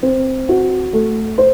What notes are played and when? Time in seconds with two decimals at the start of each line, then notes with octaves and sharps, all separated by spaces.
0.03 C4
0.49 F#4
0.93 A3
1.38 C5